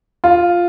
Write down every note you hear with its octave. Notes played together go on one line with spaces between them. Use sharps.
F4